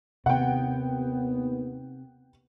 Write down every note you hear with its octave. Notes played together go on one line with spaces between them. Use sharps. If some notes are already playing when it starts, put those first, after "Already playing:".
D#2 C3 B3 F#5 G5